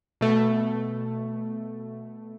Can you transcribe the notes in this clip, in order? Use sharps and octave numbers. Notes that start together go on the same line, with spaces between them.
B2 A3